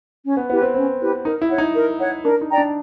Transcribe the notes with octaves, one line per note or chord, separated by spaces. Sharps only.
C#4
B3
B3 E4 G4 B4
C4
C4 C#4
E4 G4 B4
D#4 A#4
E4
C#5 F#5
D#4
A#4
C#5 F#5
D4 A#4
D#4
D5 G5 A#5
D4